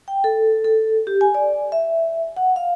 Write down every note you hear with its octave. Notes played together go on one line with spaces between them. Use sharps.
G5
A4
A4
G4
G#5
D5
E5
F#5
F5